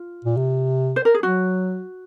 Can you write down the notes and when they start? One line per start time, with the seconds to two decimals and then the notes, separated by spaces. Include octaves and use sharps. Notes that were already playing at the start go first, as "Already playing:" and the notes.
Already playing: F4
0.25 A#2
0.37 C3
0.96 C5
1.05 A#4
1.14 G#4
1.23 F#3 F#4